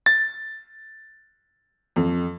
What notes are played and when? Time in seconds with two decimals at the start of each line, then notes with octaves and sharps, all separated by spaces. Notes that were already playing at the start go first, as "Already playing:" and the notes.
0.06 A6
1.96 F2